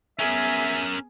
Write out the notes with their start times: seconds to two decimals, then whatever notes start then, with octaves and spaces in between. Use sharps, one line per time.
0.19 B3 C#4 G#4 A#4 E5